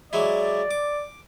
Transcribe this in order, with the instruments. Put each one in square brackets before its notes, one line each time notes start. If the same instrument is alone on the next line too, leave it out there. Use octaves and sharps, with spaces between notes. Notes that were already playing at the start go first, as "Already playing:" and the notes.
[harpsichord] F#3 G#3 E4 [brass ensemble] D5
[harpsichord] D6